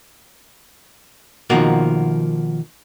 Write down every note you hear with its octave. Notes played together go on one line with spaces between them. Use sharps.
B2 D#3 F3 A#3 F#4